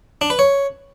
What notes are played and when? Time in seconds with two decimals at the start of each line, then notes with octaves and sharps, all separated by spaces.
0.21 D4
0.30 B4
0.39 C#5